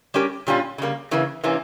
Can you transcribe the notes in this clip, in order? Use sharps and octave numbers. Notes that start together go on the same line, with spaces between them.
G3 C#4 G4 A#4
A#2 G3 C#4 F4
C#3 G3 A#3
C#3 E3 A#3
C3 E3 A#3 C#4